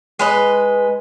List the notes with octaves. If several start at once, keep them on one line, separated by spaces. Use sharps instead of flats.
G#3 B4 D#5